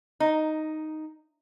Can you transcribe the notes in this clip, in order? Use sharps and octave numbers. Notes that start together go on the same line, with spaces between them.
D#4